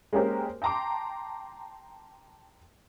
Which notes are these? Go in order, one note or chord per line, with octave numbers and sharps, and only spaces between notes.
G#3 A#3 C#4 G4 A#4 C5
G5 A5 A#5 C6 D6